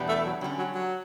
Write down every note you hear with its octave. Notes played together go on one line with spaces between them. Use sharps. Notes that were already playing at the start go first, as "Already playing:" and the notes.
Already playing: E2 B2 G3 B3 D4
A3
F#3
D3 F#3 G3 C#4
F#3
F#3